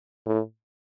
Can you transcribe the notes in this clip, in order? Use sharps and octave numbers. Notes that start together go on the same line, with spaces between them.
A2